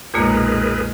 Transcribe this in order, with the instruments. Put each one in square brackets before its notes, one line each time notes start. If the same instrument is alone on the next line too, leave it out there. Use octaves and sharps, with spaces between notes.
[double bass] B1 G#3 [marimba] F2 A#2 A#3 [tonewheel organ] G#4 A#4 B4